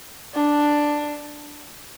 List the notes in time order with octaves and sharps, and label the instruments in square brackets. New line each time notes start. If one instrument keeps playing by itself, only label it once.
[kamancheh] D4